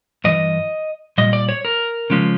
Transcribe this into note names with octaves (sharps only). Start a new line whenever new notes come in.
G2 E3 D#5
A#2 G3 D#5
D5
C#5
A#4
C#3 F3 G#3 C#4